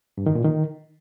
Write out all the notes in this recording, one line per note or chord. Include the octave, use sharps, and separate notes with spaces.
G2
D#3
A#2
D#3